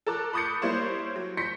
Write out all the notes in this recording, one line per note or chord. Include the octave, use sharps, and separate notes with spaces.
A4 A#4 A5 D6 F#6
B5 D6 D#6 G6 A6 C#7
G3 A#3 E4 C5 C#5
F#3
C6 G6 A#6 B6 C#7